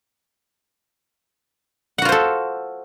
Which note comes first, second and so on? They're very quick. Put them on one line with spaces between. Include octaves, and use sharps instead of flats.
F#5 F#4 F4 C5 A4